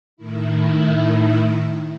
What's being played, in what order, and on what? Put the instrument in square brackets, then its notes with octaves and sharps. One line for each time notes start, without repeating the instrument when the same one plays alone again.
[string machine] A2 D#3 E4